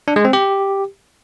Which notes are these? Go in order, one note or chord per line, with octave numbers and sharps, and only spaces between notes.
D4
G#3
C4
G4